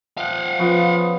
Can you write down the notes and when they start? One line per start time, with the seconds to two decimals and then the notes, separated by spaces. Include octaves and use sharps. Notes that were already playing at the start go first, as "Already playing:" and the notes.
0.17 F3 F5 F#5
0.59 C#3 F3 B3 C#6